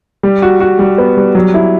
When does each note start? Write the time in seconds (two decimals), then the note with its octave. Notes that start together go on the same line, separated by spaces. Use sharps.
0.23 G3
0.42 F#4
0.60 F#4
0.79 G3
0.98 B3
1.17 G3
1.35 F#3
1.54 E4